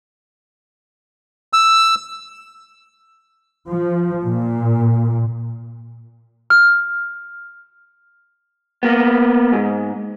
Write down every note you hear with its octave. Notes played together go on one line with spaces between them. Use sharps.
E6
F3
A#2
F6
A#3 B3
G#2